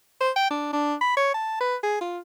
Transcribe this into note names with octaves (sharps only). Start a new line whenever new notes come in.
C5
G5
D4
D4
B5
C#5
A5
B4
G#4
F4